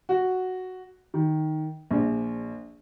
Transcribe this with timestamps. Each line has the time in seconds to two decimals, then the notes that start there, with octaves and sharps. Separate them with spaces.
0.09 F#4
1.14 D#3
1.91 A#1